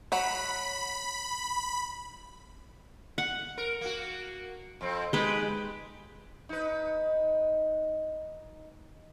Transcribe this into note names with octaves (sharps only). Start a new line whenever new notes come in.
F#3 F#5 B5
F#5
A#4
A#3 F#4
F2 C4
G#3 D#4 G4 B4
D#4 B4